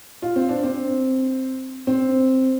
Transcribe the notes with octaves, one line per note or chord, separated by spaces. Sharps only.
F4
C4
D4
C4
C4